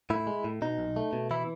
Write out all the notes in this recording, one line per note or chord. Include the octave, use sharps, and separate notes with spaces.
A2 E4
G#3
A2
B2 D#4
B1
A3
B2
E3 E4